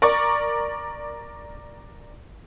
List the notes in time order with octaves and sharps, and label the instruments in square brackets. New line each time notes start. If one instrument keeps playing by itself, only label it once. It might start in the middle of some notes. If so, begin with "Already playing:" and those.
[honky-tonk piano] A#4 D5 C#6